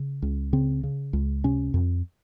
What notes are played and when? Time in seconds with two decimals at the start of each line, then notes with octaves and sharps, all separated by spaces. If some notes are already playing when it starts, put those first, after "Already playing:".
Already playing: C#3
0.22 C#2
0.53 C#3 C4
0.84 C#3
1.13 C#2
1.44 C3 C#4
1.74 F2